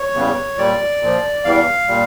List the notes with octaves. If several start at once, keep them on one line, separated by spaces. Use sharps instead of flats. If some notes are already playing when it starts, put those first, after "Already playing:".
Already playing: C#5
E2 C#3 E3 G3
A#2 G3 D5
A#2 F3
E2 E3 G3 F5
A#2 G3